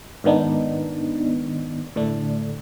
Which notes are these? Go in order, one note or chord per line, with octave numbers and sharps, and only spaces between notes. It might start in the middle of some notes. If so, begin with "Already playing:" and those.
G#2 D#3 B3 D4 D#4
A2 D3 A3 D4